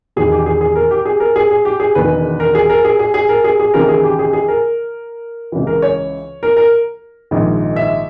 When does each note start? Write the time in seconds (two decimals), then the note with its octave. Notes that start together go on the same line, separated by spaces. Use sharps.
0.16 E1 E2 D#3 G#4
0.32 G4
0.46 G#4
0.61 G#4
0.75 A#4
0.91 G4
1.05 G#4
1.20 A#4
1.36 G#4
1.51 G#4
1.65 G4
1.80 G#4
1.95 E1 E2 D#3 B4
2.40 A#4
2.55 G#4
2.69 A#4
2.84 G#4
2.99 G#4
3.14 G#4
3.29 A#4
3.44 G#4
3.60 G#4
3.74 D#2 C#3 E3 A#4
3.89 G#4
4.03 G4
4.19 G#4
4.33 G#4
4.48 A#4
5.52 C#2 C#3 E3
5.67 A#4
5.82 C#5
6.43 A#4
6.57 A#4
7.31 A#1 G#2 D#3
7.76 E5